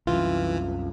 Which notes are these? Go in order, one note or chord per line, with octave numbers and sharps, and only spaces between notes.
C2 F#2 E3 F4